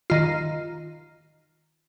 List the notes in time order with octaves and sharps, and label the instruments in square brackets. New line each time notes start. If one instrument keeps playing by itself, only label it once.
[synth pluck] D#3 F4